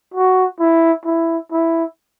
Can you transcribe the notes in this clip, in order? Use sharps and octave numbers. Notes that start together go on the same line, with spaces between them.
F#4
E4
E4
E4